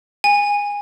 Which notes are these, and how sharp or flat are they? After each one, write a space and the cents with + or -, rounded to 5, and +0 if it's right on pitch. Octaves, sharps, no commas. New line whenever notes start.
G#5 -20